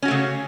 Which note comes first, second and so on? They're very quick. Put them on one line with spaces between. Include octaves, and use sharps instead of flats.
C#4 F#4 A3 C#3